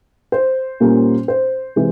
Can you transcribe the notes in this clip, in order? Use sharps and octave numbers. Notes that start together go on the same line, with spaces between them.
C5
A#2 G3 A#3 C#4
C5
C3 E3 G#3